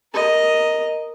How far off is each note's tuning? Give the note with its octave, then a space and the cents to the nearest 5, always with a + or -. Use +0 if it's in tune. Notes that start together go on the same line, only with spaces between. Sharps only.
A#4 +0 D#5 +0